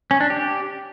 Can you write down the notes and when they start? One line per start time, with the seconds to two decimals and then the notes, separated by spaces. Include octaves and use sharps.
0.11 C#4
0.20 D4
0.30 G4